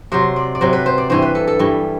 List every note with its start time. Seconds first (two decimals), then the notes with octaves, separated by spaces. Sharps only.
0.12 C3 F#3 C5
0.36 D5
0.55 D5
0.61 C3 F#3 C5
0.73 B4
0.86 C5
0.98 D5
1.10 G2 E3 G3 C5
1.22 B4
1.35 A4
1.48 A4
1.59 G2 E3 G3